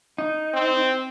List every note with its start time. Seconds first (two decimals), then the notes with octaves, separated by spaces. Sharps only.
0.18 D#4
0.54 C4